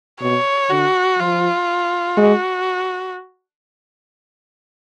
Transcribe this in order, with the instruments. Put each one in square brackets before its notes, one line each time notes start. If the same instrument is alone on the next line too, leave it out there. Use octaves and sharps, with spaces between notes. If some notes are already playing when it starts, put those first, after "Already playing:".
[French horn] B2 [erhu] C#5
[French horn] D3 [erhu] F#4
[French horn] F3 [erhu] F4
[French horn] G#3 [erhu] F#4